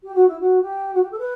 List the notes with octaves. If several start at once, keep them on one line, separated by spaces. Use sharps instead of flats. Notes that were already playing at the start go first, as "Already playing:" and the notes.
G4
F#4
E4
F#4
G4
F#4
G4
A4
B4